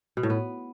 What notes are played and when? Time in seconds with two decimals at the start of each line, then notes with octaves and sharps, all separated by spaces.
0.17 B2
0.23 A2
0.30 B3